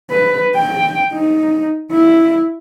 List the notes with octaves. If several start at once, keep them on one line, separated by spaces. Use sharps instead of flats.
B4
G5
D#4
E4